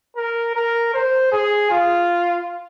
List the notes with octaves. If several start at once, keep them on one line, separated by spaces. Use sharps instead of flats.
A#4
A#4
C5
G#4
F4